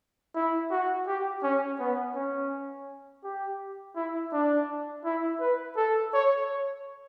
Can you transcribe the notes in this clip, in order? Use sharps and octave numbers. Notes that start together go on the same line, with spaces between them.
E4
F#4
G4
C#4
B3
C#4
G4
E4
D4
E4
B4
A4
C#5